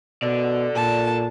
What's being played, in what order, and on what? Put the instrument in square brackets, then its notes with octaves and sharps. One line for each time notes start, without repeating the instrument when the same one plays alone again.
[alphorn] B2 [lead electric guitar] A4 D5
[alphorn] A#2 [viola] A5